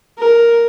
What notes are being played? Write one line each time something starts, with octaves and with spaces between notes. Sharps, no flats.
A#4